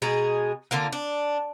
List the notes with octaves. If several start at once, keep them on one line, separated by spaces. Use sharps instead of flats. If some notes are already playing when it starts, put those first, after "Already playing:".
B2 G#3 G#4 A#5
D3 A#3 F4
D4